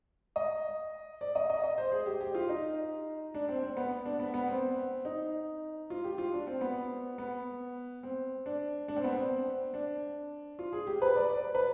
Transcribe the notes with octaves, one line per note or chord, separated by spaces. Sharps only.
D#5
D5
D#5
D#5
D#5
C5
G#4
G4
G4
F4
D#4
D4
C4
C4
B3
D4
B3
B3
C4
D#4
F4
G4
F4
D4
C4
B3
B3
C4
D4
D4
C4
B3
C4
D4
F4
G#4
G4
B4
D5
D5
B4